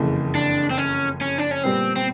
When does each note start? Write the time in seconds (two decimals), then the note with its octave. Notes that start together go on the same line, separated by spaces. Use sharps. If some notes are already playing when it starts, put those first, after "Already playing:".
Already playing: F#1 F2 C#3 E3
0.35 D4
0.70 C4
0.78 C#4
1.21 C#4
1.38 D4
1.51 C#4
1.64 A#2 G3 B3 C4
1.96 C4